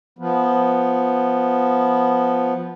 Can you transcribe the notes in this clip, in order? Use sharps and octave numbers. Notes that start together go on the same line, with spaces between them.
F3 B3